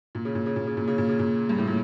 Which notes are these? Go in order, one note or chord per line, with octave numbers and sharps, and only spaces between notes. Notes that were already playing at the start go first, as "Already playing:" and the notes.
A#2
C#3
A#2
C#3
A#2
C#3
A#2
C#3
A#2
C#3
A#2
G2
A2
A#2